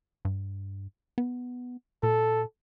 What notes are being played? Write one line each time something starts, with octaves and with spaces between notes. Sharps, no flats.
G2
B3
A#2 A4